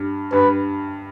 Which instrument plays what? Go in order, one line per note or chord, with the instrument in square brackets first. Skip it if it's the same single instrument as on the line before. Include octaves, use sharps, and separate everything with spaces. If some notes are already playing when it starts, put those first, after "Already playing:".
Already playing: [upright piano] G2
[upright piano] G2 [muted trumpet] B4